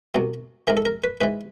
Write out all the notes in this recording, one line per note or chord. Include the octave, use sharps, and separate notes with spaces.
C2 B2 F#3
G#2 E3 A#4
A4
A#4
B4
G#2 E3 B4